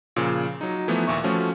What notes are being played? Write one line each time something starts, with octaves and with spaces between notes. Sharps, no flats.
A#2 C#3 F3
F#3 D#4
E3 F3 A3 B3 D#4 E4
D#2 A#2 E5 C#6
F3 A3 C#4 F4 F#4